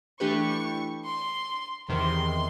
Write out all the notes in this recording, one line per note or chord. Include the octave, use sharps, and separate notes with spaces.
E3 A3 D4 G4 B4 C#6
C6
E2 C3 D#3 C6